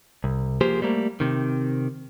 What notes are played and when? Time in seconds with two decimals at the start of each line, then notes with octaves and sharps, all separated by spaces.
0.24 C2
0.61 F3 A#3 G4 G#4 C5
0.82 G3 A3 A#3
1.20 C3 D#3